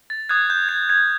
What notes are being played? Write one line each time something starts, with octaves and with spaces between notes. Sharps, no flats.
A6
D#6 F#6 G#6
G6
G#6
G#6